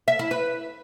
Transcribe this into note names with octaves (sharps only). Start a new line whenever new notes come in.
E5
E4
B4